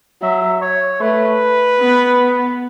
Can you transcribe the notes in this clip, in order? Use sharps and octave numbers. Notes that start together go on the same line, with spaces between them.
F#3 E5
C#5
A3 B4
B3